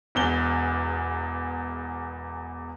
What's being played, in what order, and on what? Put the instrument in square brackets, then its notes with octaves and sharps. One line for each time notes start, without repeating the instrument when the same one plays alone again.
[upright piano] E1 E2 G7